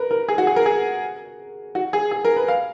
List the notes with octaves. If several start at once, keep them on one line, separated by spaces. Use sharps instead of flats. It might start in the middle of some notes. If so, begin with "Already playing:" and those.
Already playing: A#4 B4
A#4
G#4
F#4
G#4
A#4
G#4
F#4
G#4
G#4
A#4
B4
F5